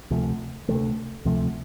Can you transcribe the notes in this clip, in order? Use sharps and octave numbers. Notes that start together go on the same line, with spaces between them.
D2 C3 F3 A3
D2 C3 F3 A3
D2 C3 F3 A3